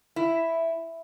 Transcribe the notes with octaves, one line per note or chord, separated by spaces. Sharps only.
E4